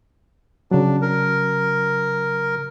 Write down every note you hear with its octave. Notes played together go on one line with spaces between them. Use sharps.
C#3 F#3 D4
A#4